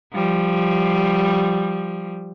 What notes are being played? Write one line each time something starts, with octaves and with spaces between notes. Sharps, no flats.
F3 G3